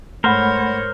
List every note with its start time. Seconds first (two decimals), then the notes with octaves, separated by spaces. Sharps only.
0.24 G#2 A3 A#4 C5 C#5 F#5 B5